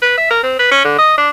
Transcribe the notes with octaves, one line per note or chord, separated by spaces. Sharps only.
B4
E5
A#4
C4
B4
C#4
D3
D#5
D4